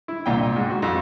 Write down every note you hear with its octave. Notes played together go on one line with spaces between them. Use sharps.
E4
C2 A#2 G5
G#2
F#4
F2 F#4